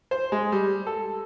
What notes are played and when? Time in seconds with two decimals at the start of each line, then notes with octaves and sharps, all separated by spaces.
0.11 C5
0.32 G#3
0.52 G3
0.87 A4